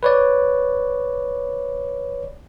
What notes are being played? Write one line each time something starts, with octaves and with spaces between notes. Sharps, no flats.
B4 C#5 D5